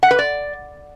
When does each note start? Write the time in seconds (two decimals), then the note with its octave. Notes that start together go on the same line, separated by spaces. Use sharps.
0.03 F#5
0.11 B4
0.19 D5